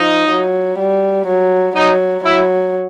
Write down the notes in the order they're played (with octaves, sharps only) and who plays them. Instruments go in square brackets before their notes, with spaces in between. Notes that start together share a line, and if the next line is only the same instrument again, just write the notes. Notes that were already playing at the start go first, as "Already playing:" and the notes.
Already playing: [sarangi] F3 [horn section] D#4
[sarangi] F#3
G3
F#3
[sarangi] F#3 [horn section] D#4
[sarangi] F#3 [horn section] E4